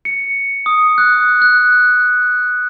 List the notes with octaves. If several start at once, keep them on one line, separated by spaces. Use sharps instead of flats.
C#7
D#6
F#6
F#6